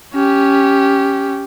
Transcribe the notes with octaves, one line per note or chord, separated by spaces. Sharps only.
C#4 G4